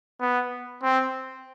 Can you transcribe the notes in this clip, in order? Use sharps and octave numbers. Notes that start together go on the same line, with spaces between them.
B3
C4